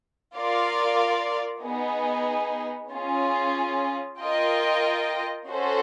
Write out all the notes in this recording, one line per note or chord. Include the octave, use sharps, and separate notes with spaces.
F4 A#4 D5 F5
B3 D#4 G#4
C#4 F4 G#4
F4 A#4 D#5 G5
C#4 F#4 A4 C5